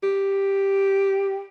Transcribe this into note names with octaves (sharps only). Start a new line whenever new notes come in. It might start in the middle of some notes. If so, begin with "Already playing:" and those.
G4